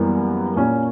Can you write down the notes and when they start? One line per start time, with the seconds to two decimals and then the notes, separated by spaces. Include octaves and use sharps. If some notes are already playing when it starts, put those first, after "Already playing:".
Already playing: F#2 E3 G3 A#3 B3
0.56 A#2 A#3 C#4